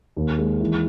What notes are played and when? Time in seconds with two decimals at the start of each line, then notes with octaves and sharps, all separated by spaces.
0.16 D#2
0.38 G#3
0.60 E3